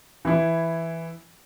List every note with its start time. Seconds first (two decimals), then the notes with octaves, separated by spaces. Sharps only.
0.25 E3 E4